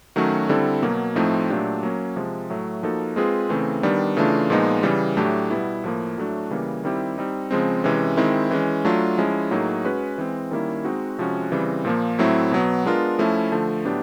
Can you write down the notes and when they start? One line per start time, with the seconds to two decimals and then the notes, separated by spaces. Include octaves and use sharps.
0.16 D#3 F#3 A3 C#4 F#4
0.49 D3 G3 C4 E4 A4
0.82 B2 F#3 A#3
1.16 A2 F3 A3 C4 D#4
1.50 A#2 F#3 A3 D4 G4
1.83 F#3 A#3 C#4
2.16 C3 F3 G#3
2.50 A2 F#3 A3
2.83 F3 A#3 D#4 F#4 A4
3.16 G#3 C4 F4 G#4 B4
3.49 C#3 E3 A3 C4
3.83 D#3 G3 B3 D4
4.17 C#3 E3 A3 D4 F4
4.50 A#2 F3 G#3 B3 D#4
4.83 C#3 E3 G3
5.17 A2 F#3 A3 D4 G4
5.50 B2 G3 B3 E4
5.84 A2 F3 A#3
6.17 A2 F#3 A3 D4 F#4
6.51 C#3 E3 G3 A#3
6.83 D#3 G3 C4 E4 G4
7.18 G3 C4 D#4
7.51 C#3 F3 G#3 C4
7.84 C3 E3 G#3 C#4
8.17 D#3 G#3 C4 E4
8.51 E3 G#3 C#4
8.85 F#3 A3 D4 F4
9.18 F3 G#3 C#4 E4
9.51 A2 F#3 A#3 D#4 G#4
9.84 G#3 C#4 F#4 B4
10.18 E3 G#3 C4
10.51 D#3 G3 A#3 C#4 E4
10.84 G#3 C4 D#4 F#4
11.18 C3 F3 G#3 C#4 F#4
11.52 C#3 E3 G3 C4
11.85 A#2 F3 A#3
12.19 A2 F#3 A3 C4 E4
12.51 B2 F#3 B3
12.85 G#3 B3 D4 F4 A#4
13.19 F3 A3 C#4 E4
13.52 D3 F3 A3
13.85 A2 F#3 B3 D4 G4